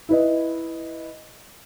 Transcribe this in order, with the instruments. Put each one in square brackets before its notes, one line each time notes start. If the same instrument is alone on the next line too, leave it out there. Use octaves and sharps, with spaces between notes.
[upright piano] E4 B4 D#5